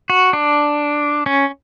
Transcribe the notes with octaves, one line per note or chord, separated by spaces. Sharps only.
F#4
D4
C#4